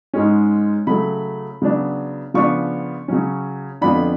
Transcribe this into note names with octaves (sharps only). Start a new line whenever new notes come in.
G#2 G#3 C#4
C#3 F#3 A3 B5
C#3 F#3 B3 D4
C#3 F3 B3 D4 C#6
C#3 F#3 C#4
F2 D3 F3 B3 D4 B5